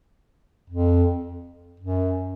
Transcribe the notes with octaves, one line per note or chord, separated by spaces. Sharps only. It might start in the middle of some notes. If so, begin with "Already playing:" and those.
F2
F#2